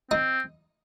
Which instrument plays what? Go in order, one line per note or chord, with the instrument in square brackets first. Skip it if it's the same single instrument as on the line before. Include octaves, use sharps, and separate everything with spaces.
[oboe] C4 [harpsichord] D#4